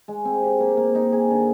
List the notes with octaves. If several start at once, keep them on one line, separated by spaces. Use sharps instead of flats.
G#3
C4
G4
A#3
A#3
D#4
G#4
D3